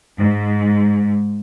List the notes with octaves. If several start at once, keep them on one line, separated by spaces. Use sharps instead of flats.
G#2